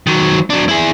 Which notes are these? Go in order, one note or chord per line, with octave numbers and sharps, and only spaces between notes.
D#3 F#3
F#3 D4
E4 G#4